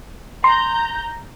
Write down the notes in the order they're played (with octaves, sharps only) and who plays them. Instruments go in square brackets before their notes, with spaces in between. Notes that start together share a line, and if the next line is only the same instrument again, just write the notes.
[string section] A#5 G6 [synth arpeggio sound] C6